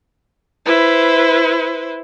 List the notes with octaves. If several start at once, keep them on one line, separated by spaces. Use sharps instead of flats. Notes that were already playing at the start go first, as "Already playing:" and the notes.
E4 B4 C5